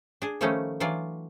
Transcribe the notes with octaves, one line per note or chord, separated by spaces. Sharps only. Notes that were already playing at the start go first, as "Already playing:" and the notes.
D4 G#4
D#3 F3 G3 A3 C#4 D#4
E3 F#3 D4 F4 D5